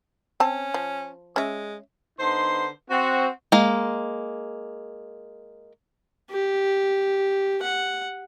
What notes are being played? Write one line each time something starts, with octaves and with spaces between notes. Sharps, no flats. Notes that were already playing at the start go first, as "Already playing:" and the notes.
C4 C#4 A5
F3
G#3 C#4 E5
D3 B3 D#4 C5 C6
C4 F#4
G#3 A#3
G4
F#5